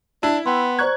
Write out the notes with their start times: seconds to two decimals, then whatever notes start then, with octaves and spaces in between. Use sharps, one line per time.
0.23 D4 E4
0.46 B3 G5 B5 C6
0.79 C5 D5 A#5 C#6 F#6 G#6